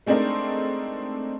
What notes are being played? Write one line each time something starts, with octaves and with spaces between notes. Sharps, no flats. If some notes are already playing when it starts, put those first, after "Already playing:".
G#3 A3 C4 D4 D#4 A#4